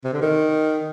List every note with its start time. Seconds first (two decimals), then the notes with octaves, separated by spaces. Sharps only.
0.04 C3
0.13 D3
0.22 D#3